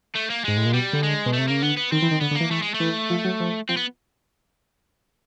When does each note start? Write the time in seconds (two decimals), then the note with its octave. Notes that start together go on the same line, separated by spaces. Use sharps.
0.15 A3
0.30 A#3
0.44 G#2 G#3
0.57 A2
0.66 A#2
0.74 B2 G3
0.93 D3
1.03 G#3
1.26 B2
1.33 A3
1.38 C3
1.48 C#3 A#3
1.62 D3 B3
1.77 B3
1.92 D#3 C4
2.02 E3
2.11 D#3
2.21 D3 B3
2.31 D3
2.36 E3 A#3
2.50 E3 A3
2.62 G#3
2.74 A3
2.80 E3
3.10 F3
3.25 F#3
3.40 F3
3.69 F3 C4
3.77 B3